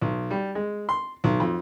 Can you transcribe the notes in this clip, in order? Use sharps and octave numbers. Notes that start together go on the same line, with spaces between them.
B1
G3
G#3
C6
B1
F2